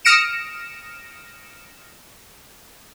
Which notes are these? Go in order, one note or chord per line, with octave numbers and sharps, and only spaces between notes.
D#6 F6 A#6 C#7 D7 E7